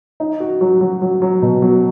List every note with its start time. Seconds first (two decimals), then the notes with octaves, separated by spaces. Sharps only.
0.20 D#4
0.40 F#4
0.61 F#3
0.81 F#3
1.02 F#3
1.22 F#3
1.42 B2
1.62 F#3